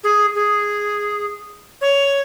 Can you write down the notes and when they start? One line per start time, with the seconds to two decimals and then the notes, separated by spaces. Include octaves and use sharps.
0.04 G#4
0.35 G#4
1.81 C#5